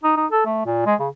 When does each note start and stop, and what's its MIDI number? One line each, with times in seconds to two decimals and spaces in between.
0.03 0.14 63
0.17 0.26 63
0.32 0.42 69
0.46 0.65 57
0.66 0.82 46
0.86 0.95 56
1.00 1.08 49